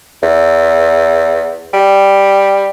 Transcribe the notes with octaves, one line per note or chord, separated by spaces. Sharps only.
E2
G3